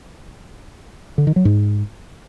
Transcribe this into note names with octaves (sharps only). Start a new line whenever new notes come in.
D3
D#3
F#3
G#2